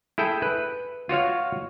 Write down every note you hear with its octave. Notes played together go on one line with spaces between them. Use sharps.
E4 G#4 A4 G5
B4
F4 F#4 C#5 F5